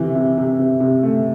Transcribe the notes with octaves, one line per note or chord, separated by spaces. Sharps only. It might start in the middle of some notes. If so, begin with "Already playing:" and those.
Already playing: C3 E3
C3
C3
C3
C3
A3